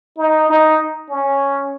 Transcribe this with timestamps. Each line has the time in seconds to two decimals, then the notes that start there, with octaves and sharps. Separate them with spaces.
0.17 D#4
0.48 D#4
1.10 C#4